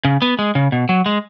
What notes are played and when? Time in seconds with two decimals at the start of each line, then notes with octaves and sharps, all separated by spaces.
0.05 C#3
0.22 B3
0.39 G#3
0.55 C#3
0.72 B2
0.89 F#3
1.06 G#3